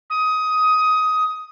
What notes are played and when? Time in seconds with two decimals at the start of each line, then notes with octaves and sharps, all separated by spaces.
0.10 D#6